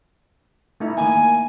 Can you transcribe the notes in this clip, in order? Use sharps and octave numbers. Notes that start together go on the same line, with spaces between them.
A3 D#4 E4
D#3 A#3 G#5